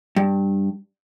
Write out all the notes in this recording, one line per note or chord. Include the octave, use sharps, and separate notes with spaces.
G2